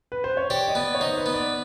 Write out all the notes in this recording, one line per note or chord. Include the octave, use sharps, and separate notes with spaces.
B4
C5
C#5
G4 D5
D#5
B3 D5
C#5
D#4 C5
B4
B3
D5